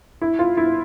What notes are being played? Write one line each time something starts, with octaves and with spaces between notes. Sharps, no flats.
E4
F4
E4